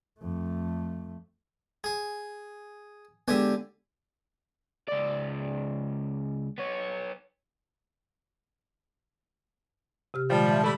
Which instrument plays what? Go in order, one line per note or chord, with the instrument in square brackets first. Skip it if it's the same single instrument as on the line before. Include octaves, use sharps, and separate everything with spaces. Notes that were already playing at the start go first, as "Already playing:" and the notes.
[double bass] F2 A3
[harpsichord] G#4 [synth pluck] G#5
[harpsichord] D3 G4 G#5 [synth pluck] G#3 B3
[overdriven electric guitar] C#2 D5
B3 C#5
[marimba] C3 G4 F6
[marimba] A#2 D#3 G#3 [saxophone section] F3 G3
[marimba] E5 A5
[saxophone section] G3 A3 E4